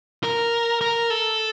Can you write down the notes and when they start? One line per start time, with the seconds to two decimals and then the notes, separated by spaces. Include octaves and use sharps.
0.24 A#4
0.81 A#4
1.10 A4